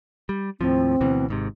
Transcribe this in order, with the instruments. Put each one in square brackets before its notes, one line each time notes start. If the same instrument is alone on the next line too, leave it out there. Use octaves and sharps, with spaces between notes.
[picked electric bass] G3
[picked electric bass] D#2 A2 F3 [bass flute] C4
[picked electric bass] D2 B2 E3
G#1 G#2 C3